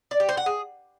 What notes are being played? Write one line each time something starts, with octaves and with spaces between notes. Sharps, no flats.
D5
G4
C5
F#5
G#4